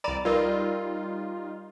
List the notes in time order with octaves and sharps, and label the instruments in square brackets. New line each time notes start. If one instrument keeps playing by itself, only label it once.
[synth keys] C2 D5 [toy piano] A#5 B5
[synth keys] G3 D#4 F4 [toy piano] A#4 D5